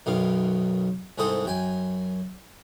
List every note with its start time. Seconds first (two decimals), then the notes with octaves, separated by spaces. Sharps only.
0.06 B1 F#2 B2 D#3 F5
1.18 C2 G#2 G#3 C4 A4 D#6
1.45 F#2 G5 G#5